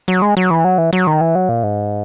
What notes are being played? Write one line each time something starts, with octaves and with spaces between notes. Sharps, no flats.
F#3
G#3
F#3
E3
F#3
E3
F#3
D#3
E3
F#3
A#2
G#2